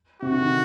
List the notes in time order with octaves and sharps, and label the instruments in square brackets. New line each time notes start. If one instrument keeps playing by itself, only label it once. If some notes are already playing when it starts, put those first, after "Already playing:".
[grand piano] C3 [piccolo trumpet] F#4
[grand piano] D3
D#3